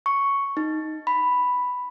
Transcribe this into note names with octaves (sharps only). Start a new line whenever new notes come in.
C#6
D#4
B5